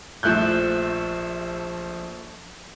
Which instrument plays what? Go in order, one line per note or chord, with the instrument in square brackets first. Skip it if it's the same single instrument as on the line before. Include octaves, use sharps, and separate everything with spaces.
[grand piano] A#1 F3 A3 F#6 G6